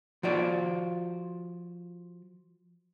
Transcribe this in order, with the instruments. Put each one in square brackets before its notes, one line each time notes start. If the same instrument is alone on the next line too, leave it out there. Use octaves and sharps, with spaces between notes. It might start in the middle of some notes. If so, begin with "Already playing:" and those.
[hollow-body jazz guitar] F3 F4 F#4 D5